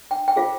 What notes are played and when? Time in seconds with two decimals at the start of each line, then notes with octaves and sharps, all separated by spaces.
0.11 G5
0.28 G5
0.36 F4 G#4 C5 F5